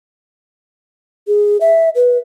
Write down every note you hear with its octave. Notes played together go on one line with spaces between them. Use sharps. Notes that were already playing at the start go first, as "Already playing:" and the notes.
G#4
E5
B4